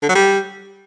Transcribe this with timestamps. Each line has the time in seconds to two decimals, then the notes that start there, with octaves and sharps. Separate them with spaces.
0.02 D3
0.09 F#3
0.15 G3